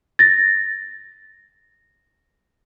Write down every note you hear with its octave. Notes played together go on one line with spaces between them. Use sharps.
A6 A#6